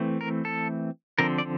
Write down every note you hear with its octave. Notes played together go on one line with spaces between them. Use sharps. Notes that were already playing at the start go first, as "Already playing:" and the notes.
Already playing: E3 A3 C4
A#4
A4
D3 F3 C4 A#4
D5